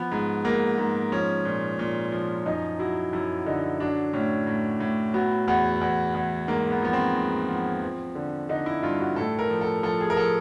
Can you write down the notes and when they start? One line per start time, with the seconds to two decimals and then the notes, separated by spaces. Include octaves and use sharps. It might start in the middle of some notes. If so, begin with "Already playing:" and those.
Already playing: F3 B3
0.12 G#2
0.45 G#2 A#3
0.78 G#2
1.12 F3 C#4
1.45 A#2
1.79 A#2
2.12 F3
2.46 F#2 D#4
2.79 F#3 E4
3.13 F#2 E4
3.46 D3 D#4
3.80 F#3 D4
4.13 A2 C#4
4.47 A2
4.80 A2
5.14 F#3 B3
5.48 E2 B3
5.81 E2
6.14 E2
6.48 G#2 A#3
6.70 B3
6.82 F3 B3
6.93 C4
7.15 G#2
7.49 F3
7.82 F3
8.15 D3
8.49 D3 D#4
8.66 E4
8.83 G2 F4
9.00 F#4
9.16 A2 A4
9.39 A#4
9.50 F3
9.61 A4
9.83 F3 A4
10.01 G#4
10.10 A#4
10.17 F3 A4